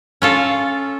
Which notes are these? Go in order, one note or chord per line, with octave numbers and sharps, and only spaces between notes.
C#4 F4 A4